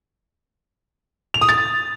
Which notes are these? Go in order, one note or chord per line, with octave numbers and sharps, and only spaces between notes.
F7
D#6
A6